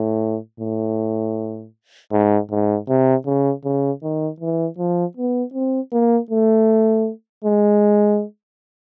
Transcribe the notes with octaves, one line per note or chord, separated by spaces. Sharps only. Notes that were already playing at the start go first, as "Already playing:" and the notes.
Already playing: A2
A2
G#2
G#2
C3
C#3
C#3
D#3
E3
F3
B3
C4
A#3
A3
G#3